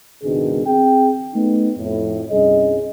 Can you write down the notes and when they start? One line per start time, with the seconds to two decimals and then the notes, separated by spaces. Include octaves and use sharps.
0.23 G#1 C#2 B2 D#3 D4 G#4
0.66 C4 G#4 G5
1.35 A3 B3 D#4
1.78 F2 A2
2.30 C2 G2 C#4 G#4 D#5